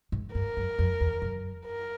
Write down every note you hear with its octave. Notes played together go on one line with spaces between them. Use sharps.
G#2
G2 A#4
F#2
F2
E2
F#2
A#4